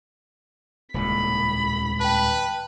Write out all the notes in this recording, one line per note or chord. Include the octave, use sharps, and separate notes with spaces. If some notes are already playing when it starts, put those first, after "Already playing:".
D#1 C#2 A2 B5
B4 G5 A5